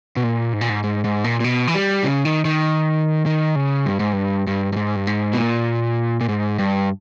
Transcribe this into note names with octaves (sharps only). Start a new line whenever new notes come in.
B2
A#2
G#2
A#2
G#2
G#2
G#2
A#2
A#2
B2
E3
G3
C#3
D#3
D#3
D#3
C#3
G2
G#2
G2
G2
G2
G#2
G2
G#2
B2
A#2
A#2
G#2
G2